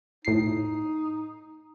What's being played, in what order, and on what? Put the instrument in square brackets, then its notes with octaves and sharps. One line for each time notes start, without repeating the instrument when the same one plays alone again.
[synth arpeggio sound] A2 C7 [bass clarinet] D#4